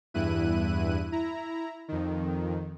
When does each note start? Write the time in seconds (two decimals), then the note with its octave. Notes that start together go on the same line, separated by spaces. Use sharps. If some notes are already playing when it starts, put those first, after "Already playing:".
0.14 E2 G2 E4 F#6 D#7
1.12 E4 A#5
1.88 F2 D#3